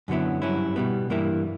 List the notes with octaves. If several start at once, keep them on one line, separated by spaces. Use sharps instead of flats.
F#2 D3 F#3 B3 E4
G2 F#3 C#4 E4
B2 G3 B3
G2 E3 A#3 E4